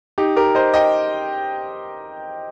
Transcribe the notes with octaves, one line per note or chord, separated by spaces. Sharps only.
D#4 G4
G4 A#4
C5 D#5
D#5 G5